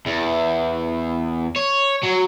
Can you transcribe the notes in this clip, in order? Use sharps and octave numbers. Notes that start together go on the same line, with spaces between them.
E2
C#5
F#3